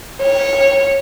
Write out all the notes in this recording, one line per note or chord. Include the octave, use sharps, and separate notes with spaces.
C#5